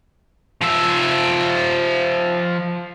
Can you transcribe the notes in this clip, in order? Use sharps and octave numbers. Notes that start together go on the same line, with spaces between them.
F3 E5